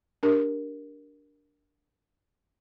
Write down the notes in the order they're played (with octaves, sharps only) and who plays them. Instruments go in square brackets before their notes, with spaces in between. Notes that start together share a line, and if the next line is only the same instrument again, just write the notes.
[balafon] D4 G4 A#4